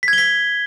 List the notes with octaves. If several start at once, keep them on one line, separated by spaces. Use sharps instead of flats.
B6
G#6
G7
B6